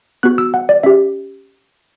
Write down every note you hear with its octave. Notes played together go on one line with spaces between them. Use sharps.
B3 F#4 F#6
E6
F#5
D5
C#4 G4 E5